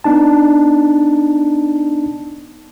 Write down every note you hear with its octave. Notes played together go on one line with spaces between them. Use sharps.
B3 D4 D#4 A5